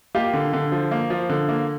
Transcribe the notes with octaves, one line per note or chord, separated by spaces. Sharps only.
A#3 F4 G4
D3
D3
F3
A#3
F3
D3
A#3